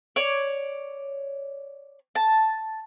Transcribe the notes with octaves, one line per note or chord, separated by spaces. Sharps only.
C#5 D5
A5